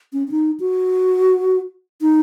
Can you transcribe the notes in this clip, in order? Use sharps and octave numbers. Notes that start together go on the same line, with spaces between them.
C#4
C#4
D#4
F#4
D#4